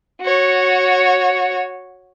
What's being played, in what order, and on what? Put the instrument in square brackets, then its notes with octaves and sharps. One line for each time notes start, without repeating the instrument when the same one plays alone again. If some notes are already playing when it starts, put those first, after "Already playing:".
[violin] F#4 C#5